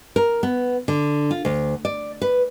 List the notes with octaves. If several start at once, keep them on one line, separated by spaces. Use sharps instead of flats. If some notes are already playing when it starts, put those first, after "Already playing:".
A#4
B3
D3
F4
D2
D5
B4